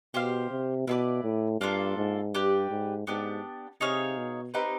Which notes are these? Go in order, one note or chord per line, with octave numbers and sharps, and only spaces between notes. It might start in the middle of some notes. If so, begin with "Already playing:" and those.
B2 G4 C5 F5
C3
B2 E4 G#4 B4 D5
A2
G2 A#3 D4 F4 A4
G#2
G2 G4 B4 D5
G#2
G#2 B3 D4 G4
C3 D#4 G#4 C#5 F5
B2
C4 D#4 G4 B4